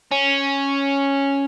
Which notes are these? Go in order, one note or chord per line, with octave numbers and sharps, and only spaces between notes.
C#4